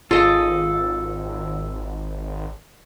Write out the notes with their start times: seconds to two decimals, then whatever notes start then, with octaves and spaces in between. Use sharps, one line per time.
0.11 G#1 F4 G#4 A4 D#5